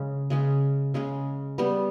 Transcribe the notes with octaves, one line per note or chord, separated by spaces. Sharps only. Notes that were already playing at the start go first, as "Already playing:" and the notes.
Already playing: C#3 G#3 C#4
C#3 G#3 C#4
C#3 G#3 C#4
G3 B3 G4